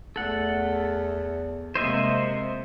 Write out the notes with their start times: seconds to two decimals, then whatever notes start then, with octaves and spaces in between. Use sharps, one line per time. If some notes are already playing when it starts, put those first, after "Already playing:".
0.16 E2 A3 A4 F#5
1.75 C3 G#3 A#3 C5 D#5 E5